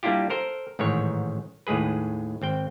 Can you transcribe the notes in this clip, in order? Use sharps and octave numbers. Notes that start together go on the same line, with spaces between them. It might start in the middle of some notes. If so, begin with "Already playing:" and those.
G3 A#3 D4 E4 F4 G4
A4 A#4 C5
A1 G#2 D#3 E3 C#5
D#2 A2 G#3 G#4 B4
G#1 C4 G5